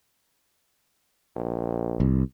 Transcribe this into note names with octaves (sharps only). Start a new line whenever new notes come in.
A#1
C2